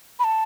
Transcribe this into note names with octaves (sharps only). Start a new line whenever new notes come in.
B5
A5